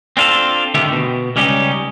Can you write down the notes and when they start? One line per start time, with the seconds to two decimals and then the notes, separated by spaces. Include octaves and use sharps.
0.17 C4 D4 F4 G#4 A4
0.75 D3 D#3 A3 G4
0.91 B2
1.36 C#2 G3 C#4 D#4 G4